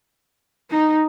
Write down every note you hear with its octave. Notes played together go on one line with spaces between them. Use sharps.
D#4